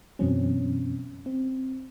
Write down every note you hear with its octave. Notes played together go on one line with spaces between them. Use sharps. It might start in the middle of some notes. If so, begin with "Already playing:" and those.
F#2 B2 E3 F#3 C4 C#4
C4